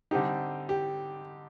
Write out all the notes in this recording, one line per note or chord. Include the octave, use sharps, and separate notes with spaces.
D3 G3 C4 D#4 G4
G4